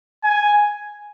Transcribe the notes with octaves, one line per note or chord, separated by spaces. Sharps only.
G#5